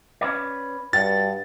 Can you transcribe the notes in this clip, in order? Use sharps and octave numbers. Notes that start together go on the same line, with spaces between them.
C#4 B4 D5
G2 F#4 A6